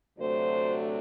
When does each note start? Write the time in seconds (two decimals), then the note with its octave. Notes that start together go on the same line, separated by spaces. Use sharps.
0.18 D2 C3 F#3 A3 D4 C5